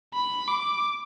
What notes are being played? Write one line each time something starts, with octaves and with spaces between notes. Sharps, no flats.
B5
D6